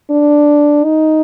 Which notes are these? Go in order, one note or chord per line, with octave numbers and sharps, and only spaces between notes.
D4
D#4